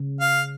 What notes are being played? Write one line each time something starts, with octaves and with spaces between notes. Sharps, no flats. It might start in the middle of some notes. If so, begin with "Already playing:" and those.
Already playing: C#3
F5